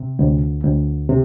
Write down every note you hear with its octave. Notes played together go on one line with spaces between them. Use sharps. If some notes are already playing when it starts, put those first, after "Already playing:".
Already playing: C3
D2
D2
C3